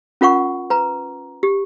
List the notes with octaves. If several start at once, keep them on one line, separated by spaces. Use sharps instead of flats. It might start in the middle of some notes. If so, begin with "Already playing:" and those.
C#4 F4 A#4 F#5 C#6
B4 A#5
G4